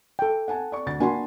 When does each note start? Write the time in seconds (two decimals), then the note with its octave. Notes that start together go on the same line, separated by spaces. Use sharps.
0.19 A4 G5
0.48 F#5 G#5 A5
0.72 D5 C#6
0.86 D2 D5 A6
1.00 A#3 D4 F#4 G#5 B5 C6